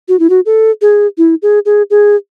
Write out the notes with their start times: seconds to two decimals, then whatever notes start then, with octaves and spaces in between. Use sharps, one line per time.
0.08 F#4
0.20 E4
0.30 F#4
0.46 A4
0.82 G#4
1.18 E4
1.42 G#4
1.66 G#4
1.90 G#4